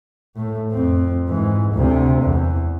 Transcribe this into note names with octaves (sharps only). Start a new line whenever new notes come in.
A2 A3
F2 C4
G#2 E3
D2 C3
E2